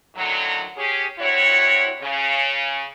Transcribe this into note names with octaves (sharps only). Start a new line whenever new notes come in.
A2 D3 D#3 F#3
C#4 G4 G#4
D2 C3 E4 F#4 C#5
C#3 C#4